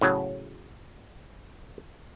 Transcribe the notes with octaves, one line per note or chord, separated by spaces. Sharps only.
A2 C#3 F#3